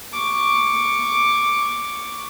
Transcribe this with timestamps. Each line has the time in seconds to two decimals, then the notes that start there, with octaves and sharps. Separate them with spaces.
0.13 C#6 D6